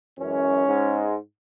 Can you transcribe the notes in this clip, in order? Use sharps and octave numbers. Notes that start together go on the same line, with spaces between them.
F#2 E3 G#3 C#4
G#2 G#3